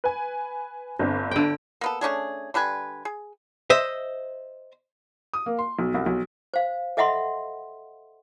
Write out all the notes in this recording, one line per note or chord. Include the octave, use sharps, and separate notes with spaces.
B4 G#5
G1 C4 D4
D3 G5
A#3 B3 A4
A3 C#4 D4 G#4
D3 G3 B4 G#5
G#4
C5 D#5 E5
D#6
A#3
C6
B1
C2
B1
C5 F5
A4 D#5 E5 F#5 B5 C6